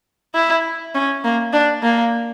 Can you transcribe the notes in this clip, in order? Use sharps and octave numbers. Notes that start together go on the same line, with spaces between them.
E4
C#4
A#3
D4
A#3